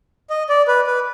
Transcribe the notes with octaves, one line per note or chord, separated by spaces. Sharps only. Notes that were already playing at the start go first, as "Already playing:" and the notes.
D#5
D5
B4
B4